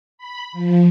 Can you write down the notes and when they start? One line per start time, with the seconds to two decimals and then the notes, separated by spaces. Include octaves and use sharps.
0.18 B5
0.53 F3